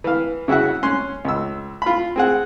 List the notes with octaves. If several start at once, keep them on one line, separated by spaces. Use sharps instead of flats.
E3 F5
C#3 E4 F#4 E5 F#5
C#4 C6 F#6
C#2 E6
F4 B5
C4 G#4 F#5